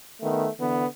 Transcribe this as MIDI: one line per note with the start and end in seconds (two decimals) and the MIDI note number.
0.22 0.48 51
0.22 0.48 57
0.22 0.48 59
0.59 0.85 50
0.59 0.85 52
0.59 0.85 59